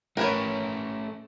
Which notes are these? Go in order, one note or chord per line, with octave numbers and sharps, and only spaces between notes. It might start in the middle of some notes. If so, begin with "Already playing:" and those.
A3 C#4 A#4 B4 C#5